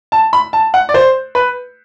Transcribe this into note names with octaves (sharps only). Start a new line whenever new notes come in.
A5
B5
A5
F#5
D5
C5
B4